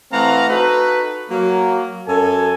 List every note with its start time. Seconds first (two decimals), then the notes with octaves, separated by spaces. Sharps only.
0.12 E3 A3 C4 F5 F#5 A#5
0.49 D#4 F#4 A4 B4
1.30 F#3 A#3
2.08 F#2 A4 G#5